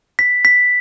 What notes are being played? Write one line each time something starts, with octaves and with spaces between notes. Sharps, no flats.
B6
B6